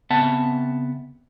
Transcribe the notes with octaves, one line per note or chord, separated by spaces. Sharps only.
C#3 B3 C4 E5 F#5 A5